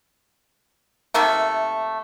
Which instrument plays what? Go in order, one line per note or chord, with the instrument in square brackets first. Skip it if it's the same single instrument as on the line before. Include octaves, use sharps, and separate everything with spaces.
[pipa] C3 D#3 A3 A#3